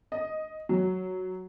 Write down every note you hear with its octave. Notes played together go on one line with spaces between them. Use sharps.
D#5
F#3